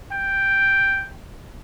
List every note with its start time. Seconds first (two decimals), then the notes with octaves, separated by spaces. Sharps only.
0.12 G5